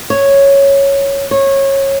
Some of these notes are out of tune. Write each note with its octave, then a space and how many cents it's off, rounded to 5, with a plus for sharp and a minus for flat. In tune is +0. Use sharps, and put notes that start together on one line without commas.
C#5 +0
C#5 -20